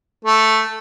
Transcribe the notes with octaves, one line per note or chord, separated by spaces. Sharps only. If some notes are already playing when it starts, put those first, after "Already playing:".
A3